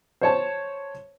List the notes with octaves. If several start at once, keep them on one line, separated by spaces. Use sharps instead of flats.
C5 C#5 A5